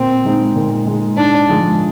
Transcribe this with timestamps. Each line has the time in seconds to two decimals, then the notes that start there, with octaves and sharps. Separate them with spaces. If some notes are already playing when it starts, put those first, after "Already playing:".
Already playing: A#2 C4
0.25 G#3 D#4
0.56 A#2
0.86 G#3 D#4
1.17 G#2 D4
1.48 F3 G#3